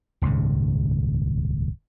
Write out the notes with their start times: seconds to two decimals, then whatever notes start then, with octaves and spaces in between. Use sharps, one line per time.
0.22 D#1 C#2 G#2 C#3